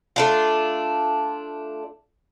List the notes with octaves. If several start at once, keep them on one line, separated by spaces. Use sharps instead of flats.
A3 D4 F4